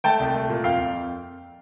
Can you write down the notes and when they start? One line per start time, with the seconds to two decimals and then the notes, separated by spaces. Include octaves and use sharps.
0.04 A3 G5 A5
0.20 C2
0.34 A3
0.49 A#2
0.64 F2 F5 G5
0.80 F2